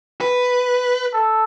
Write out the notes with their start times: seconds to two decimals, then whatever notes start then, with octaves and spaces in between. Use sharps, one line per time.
0.21 B4
1.13 A4